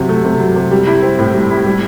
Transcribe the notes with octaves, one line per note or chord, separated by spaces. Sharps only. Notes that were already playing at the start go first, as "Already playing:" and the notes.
Already playing: C3 F#3
A3
C3
F#3
C3
G3
E4
C4
A2
G3
E4
G3